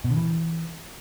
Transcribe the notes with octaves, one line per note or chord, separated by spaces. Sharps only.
B2
D3
E3